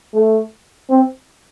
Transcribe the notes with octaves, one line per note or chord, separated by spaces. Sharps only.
A3
C4